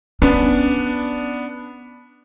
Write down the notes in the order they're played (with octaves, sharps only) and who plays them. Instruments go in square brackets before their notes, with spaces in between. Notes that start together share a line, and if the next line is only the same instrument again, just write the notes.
[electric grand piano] B3 D4 [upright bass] C#4